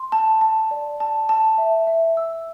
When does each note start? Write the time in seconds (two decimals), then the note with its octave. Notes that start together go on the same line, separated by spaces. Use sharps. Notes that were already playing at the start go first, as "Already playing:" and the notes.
Already playing: C6
0.12 A5
0.41 A5
0.71 D5
1.00 A5
1.29 A5
1.58 E5
1.87 E5
2.17 E6